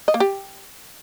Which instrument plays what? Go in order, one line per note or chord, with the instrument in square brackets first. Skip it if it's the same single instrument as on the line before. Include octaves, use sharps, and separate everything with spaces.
[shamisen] D#5
A#3
G4